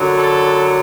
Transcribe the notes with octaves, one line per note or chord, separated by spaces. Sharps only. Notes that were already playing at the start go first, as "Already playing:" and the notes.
Already playing: F#2 D3 F#3
A4